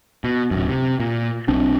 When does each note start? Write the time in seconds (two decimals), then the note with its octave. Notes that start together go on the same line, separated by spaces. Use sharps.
0.24 B2
0.51 D1 F#2
0.69 C3
1.00 A#2
1.48 B1 C4 D4